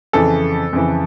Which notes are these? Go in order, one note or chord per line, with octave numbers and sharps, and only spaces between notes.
F2 C#3 E3 A4
F2 C#3 E3